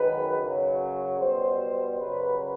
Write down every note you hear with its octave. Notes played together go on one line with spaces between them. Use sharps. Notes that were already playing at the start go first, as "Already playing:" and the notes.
Already playing: F#2 D#3 G#3 B4
F#2 C#3 F#3
B2 G3 C5
F#2 C#3 F#3 B4